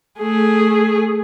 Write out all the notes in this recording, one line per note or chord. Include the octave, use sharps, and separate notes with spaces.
A3 G#4